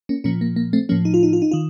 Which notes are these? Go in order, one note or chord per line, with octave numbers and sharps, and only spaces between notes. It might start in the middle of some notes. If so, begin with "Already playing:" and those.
A#3 C#4
A#2 F3 A#3 C#4
A#3
A#3
A3 C4
A2 F3 A#3 C#4
D#4
F4
D#4
F4
D#4
D#3 F4